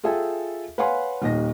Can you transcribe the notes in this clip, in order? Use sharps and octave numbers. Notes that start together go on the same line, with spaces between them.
F4 G#4 A4 E5 G5 G#5
B4 C#5 F5 F#5 G#5 C6
D#1 D#2 D#5 A#6